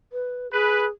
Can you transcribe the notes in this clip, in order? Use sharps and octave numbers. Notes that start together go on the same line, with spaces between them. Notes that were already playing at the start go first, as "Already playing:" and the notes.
B4
G#4 B4